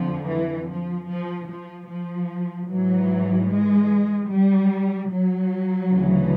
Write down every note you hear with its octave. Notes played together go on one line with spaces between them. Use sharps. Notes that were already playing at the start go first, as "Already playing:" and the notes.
Already playing: F2 D3 F3
E3
F3
F3
F3
F3
G#2 E3 F#3
G#3
G3
F#3
D2 C#3 E3